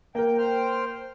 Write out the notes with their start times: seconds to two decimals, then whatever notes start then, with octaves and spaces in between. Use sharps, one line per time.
0.15 A#3 A#4 G5
0.38 C5 G5 F6